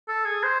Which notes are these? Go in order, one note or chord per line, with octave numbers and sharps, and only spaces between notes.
A4
G#4
C5